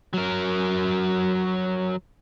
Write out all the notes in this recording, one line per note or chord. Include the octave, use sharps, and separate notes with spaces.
F#3 A#4